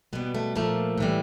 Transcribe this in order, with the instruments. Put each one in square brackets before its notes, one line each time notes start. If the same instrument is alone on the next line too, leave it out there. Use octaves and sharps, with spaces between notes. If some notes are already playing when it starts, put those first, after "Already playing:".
[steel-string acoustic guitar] B2 G3 B3
A3
A#2 F3 A3 A#3
A2 E3 G3